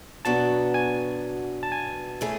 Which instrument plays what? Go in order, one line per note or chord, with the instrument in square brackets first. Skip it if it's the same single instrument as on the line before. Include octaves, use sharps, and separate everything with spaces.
[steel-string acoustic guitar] B2 F#3 B3 D4 F#4 [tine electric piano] A5
[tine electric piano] G#5
A5
G#5
[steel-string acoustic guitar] E3 A3 C#4 G#4